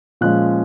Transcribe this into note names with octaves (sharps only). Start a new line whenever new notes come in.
A#2 F3 G#3 C#4 F#6